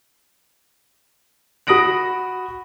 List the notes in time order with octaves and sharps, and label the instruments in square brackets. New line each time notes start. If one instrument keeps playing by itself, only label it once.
[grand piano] F#4 B5 D#6 A#6 D7 F#7